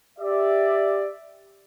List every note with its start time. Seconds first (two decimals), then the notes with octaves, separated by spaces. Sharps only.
0.19 G4 D5 E5